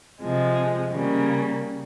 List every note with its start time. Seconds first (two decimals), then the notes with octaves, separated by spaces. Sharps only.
0.20 C3 F3 G#3
0.91 C#3 G3 A#3